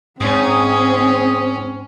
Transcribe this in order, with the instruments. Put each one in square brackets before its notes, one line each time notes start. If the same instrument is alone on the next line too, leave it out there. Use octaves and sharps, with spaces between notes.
[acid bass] G#2 [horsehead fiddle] C4 [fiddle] C#4 [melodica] G#4 D#6